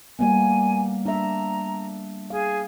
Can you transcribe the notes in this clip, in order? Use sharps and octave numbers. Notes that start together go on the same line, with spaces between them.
G3 A#3 B3 G#5
D4 E5 A#5
G#4 F5